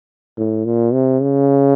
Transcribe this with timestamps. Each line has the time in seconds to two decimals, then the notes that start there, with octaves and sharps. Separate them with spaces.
0.37 A2
0.65 A#2
0.93 C3
1.22 C#3